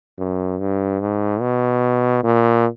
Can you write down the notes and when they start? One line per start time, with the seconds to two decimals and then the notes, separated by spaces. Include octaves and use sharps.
0.18 F#2
0.60 G2
1.01 G#2
1.41 B2
2.23 A#2